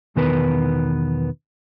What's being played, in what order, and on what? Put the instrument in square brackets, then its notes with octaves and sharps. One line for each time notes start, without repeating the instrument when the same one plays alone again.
[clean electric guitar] B1 E2 D#3 B3 A#4 B4